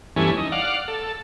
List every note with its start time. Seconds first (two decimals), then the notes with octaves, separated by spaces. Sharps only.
0.16 E2 G2 E3 A3 C#4 G#5
0.37 D#4
0.52 D5 F5 F#5
0.88 A4